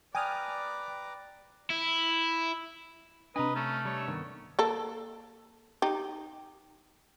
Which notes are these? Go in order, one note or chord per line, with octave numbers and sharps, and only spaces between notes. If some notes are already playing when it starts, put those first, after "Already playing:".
B4 D5 G5 G#5 A#5 D6 D#6 F6
E4
C3 D4 B4 D#5 G#5 A#5
A3 C#4
G3 C#5
G2 D#3 B3
A#3 A4
D#4 G4